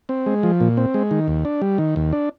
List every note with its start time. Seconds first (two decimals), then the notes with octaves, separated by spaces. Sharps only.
0.09 C4
0.26 G#3
0.43 F3
0.60 A#2
0.77 C4
0.94 G#3
1.11 D#3
1.28 D#2
1.45 D4
1.62 G3
1.78 D#3
1.96 D#2
2.13 D4